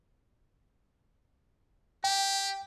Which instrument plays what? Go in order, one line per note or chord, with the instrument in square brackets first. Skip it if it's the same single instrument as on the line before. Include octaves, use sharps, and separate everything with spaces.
[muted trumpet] G4 [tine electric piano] G5